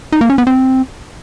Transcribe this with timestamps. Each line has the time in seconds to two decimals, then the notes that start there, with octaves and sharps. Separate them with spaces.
0.12 D#4
0.21 A#3
0.30 C#4
0.38 B3
0.47 C4